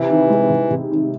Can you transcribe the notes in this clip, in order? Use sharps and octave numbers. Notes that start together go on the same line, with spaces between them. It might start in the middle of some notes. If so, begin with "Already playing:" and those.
Already playing: C3 E3 E4
D#3
G#3
C3
C3
D#3